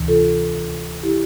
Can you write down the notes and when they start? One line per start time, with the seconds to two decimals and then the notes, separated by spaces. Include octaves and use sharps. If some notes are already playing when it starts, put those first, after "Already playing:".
Already playing: D2 C3 E3
0.08 F4 A4
1.03 E4 G4